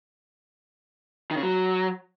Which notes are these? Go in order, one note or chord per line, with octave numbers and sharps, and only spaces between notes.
D#3
C#3
F#3